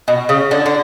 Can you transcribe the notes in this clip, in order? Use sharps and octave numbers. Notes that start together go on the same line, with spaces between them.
B2
C#3
D3
D3